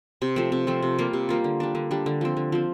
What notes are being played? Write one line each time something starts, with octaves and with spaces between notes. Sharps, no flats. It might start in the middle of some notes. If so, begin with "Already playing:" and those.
C3
F3 A3 C4
C3
F3 A3 C4
C3
G3 A#3 F4
C3
G3 A#3 F4
D3
G3 D4
D3
G3 D4
D3
F3 C4
D3
F3 C4